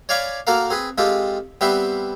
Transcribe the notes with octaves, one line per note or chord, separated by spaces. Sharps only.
C#5 D5 F5 G#5 B5 D6
A#3 F#4 A4 A#4 F5
C4 G#4 B4
G#3 C4 F4 G4 A4
G3 B3 C4 B4 C5 E5